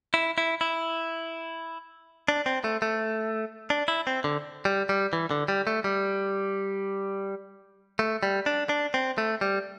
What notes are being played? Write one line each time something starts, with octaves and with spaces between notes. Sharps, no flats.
E4
E4
E4
D4
C4
A3
A3
D4
E4
C4
D3
G3
G3
E3
D3
G3
A3
G3
A3
G3
D4
D4
C4
A3
G3